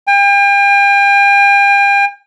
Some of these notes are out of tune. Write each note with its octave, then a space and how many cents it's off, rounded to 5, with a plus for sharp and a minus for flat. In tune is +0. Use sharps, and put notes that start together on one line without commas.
G5 +40